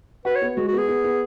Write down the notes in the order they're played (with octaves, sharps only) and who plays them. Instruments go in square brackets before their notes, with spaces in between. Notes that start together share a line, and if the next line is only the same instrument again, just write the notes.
[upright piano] F#4 [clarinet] B4
[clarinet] C#5
[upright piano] B3
[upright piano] G#3 [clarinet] F#4
[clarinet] F#4
[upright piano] B3 [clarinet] G#4
[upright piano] B3
B3